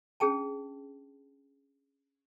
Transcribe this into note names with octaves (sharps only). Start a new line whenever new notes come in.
C#4 D4 G#4 G5 A5